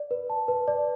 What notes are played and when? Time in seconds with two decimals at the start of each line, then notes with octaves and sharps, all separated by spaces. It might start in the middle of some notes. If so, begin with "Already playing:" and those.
Already playing: D5
0.11 B4
0.30 A5
0.48 B4
0.68 D5